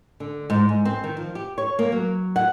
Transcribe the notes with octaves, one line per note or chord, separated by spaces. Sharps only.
D3
G#2
G#2
C4
D#3
F3
G4
C#5
A#3
F#3
F#5